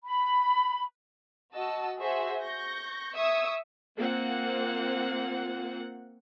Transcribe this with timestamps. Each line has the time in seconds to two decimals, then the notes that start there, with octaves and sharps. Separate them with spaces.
0.04 B5
1.55 F#4 D#5 A5 E6
1.98 F#4 G#4 C5 E5
2.42 C#6 G6 A#6
3.16 E5 C#6 D#6 E6 G#6
3.97 A#3 C4 F4 F#5